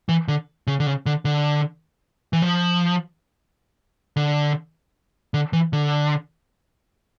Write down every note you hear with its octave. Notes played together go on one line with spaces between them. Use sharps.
E3
D3
C#3
D3
C#3
D3
D3
E3
F3
D3
D3
E3
D3